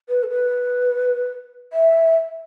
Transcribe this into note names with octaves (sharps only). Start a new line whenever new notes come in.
B4
A4
B4
E5